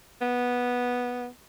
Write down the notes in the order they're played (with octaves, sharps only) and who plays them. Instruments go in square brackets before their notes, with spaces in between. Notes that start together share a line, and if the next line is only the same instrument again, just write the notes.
[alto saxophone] B3